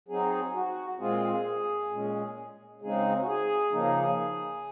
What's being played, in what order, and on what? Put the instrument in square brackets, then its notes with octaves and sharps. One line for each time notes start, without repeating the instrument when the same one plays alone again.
[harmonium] F#3 C4 D#4 G#4
F#4
A#2 G#3 C4 F4 G#4
A#2 G#3 C#4
C#3 G#3 C4 D#4 G#4
F#4
G#4
C#3 F3 A#3 D#4